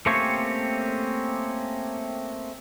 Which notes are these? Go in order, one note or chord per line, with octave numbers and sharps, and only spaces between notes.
A3 A#3 C4 C#4 G4 C#5